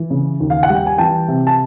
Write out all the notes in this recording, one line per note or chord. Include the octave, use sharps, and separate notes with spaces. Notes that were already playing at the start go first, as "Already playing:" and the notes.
Already playing: E3
C#3
D#2
F5
F#5
G3
G5
G#5
E3 G5 A5
C3
A5